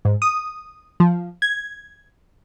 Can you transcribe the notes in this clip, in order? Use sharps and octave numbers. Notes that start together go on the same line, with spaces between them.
G#2
D#6
F3
G#6